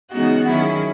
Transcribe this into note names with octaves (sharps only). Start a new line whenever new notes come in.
C#3 E3 G#3 B3 D#4 F#4
D#3 F#3 C#4 E4 G#4